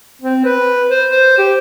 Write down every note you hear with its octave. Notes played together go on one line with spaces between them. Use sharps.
C4
B4
C5
C5
G4